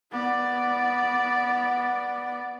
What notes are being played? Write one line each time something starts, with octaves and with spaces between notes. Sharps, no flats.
B3 D5